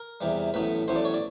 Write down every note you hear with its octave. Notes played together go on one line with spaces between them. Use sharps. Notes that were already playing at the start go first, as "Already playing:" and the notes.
Already playing: A#4
E2 C3 E3 G3
A1 A2 F#3 B3 B4
A1 A2 F#3 B3 C5
D5
C#5
D5